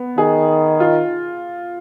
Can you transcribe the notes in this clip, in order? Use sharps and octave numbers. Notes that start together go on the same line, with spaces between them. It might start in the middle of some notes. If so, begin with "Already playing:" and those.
Already playing: B3
D#3 G#4
F4